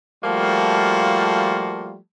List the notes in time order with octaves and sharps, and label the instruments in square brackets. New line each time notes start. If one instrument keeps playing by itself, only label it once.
[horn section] F3 G3 A3 A#3 F4 F#4